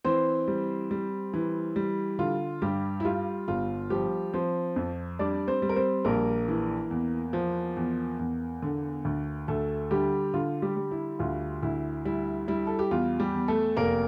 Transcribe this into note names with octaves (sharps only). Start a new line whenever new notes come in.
E3 C4 C5
G3
G3
E3
G3
D3 F4
G2 G3 G4
E4
G3 F4
G1 F4
F3 G3 G4
F3 C4 C5
F2
G3 D4 D5
C4 C5
G3
A#4
C4 C5
A#1 A#3 A#4
E3
E2
F3
E2
E2
D3
D2
D2 A3 A4
D3 G3 G4
D3 F4
G3 G4
G3
E4
D2 F4
D2 E4
G3 E4
G3 E4
A4
G4
E2 F4
G3 G4
E2
A3 A4
F1 A#3 A#4